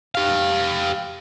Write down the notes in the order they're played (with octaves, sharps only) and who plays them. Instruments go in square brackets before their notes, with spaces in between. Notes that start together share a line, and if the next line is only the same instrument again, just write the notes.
[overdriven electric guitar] G4 F5